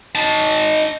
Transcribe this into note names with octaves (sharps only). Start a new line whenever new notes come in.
D#4 A5